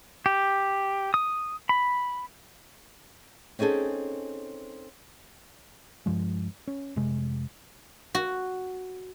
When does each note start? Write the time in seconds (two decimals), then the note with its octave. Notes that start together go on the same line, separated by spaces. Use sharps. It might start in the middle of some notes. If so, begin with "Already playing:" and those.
0.26 G4
1.14 D#6
1.69 B5
3.59 C4 C#4 D#4 G#4 A4
6.06 G2 F3 G#3
6.68 C#4
6.96 F1 C3 G#3
8.15 F#4